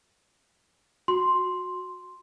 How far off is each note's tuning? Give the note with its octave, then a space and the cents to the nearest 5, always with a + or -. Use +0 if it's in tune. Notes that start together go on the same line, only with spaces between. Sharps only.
F#4 -20 C6 +0